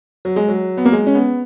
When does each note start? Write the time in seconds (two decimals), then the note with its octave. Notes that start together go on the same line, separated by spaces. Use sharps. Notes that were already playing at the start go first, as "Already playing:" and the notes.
0.25 F#3
0.36 G#3
0.48 F#3
0.77 B3
0.85 A#3
0.92 G#3
1.07 C#4
1.15 B3